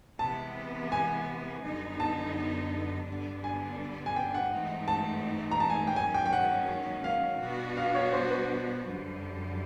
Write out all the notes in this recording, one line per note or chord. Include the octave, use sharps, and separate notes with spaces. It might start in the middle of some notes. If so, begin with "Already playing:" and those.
C3 E3 G#3 B3 A5
G#5
F#2 D3 G3 B3 D#4
A5
G2 D3 G3 B3 D4
G#5
G#5
G5
F#5
G#2 E3 A3 C4 D#4
A5
A#5
A5
G#5
G5
G#2 D#3 F#3 A#3 C#4 G#5
G5
G5
F#5
F5
B2 G3 B3 D4 F#4
F5
C#5
C5
B4
F#2 D3 G3